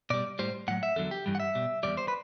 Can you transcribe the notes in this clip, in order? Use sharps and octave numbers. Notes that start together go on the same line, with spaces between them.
B2 G3 D5
A2 G3 C5
A2 F#3 F#5
E5
E2 D3 F#3 A4
G4
G2 E3 G3
F#5
E5
B2 G3
E2 B2 G3 D5
C5
B4